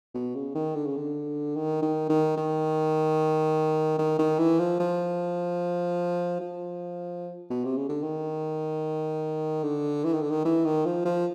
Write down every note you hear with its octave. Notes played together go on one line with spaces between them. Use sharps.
B2
C#3
D#3
D3
C#3
D3
D#3
D#3
D#3
D#3
D#3
D#3
E3
F3
F3
F3
B2
C3
C#3
D3
D#3
D3
E3
D#3
D3
D#3
E3
D#3
F3
F3